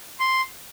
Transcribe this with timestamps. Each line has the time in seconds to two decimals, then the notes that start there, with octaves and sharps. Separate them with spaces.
0.20 C6